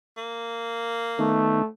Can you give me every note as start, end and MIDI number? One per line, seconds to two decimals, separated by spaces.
0.17 1.60 58
1.19 1.62 51
1.19 1.67 57
1.19 1.62 59
1.19 1.62 63